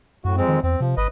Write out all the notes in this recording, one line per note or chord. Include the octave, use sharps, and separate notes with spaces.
F#2 A2 F#4
F2 G#3 C4
D#3
E2 C4
C3 F3
G#1 B4 D#5